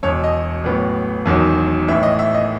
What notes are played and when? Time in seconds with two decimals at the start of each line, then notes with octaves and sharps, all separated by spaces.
0.03 E1 E2 B2 C#5
0.24 D#5
0.64 A1 A2 F#3 B3
1.26 E1 E2 D#3 F#3
1.88 A1 A2 E3 E5
2.03 D#5
2.19 E5
2.34 D#5